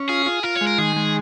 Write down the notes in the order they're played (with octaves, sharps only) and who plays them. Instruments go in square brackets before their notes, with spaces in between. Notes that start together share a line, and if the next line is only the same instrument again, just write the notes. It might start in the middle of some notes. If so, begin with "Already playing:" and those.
Already playing: [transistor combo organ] C#4
[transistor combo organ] F4 [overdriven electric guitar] G#4
[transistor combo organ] F4
[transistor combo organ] F4 [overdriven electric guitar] A#4
[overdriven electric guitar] C#5
[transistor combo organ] G#3
[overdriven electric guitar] A#4
[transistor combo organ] D#3 [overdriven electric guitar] G#4
[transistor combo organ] G#3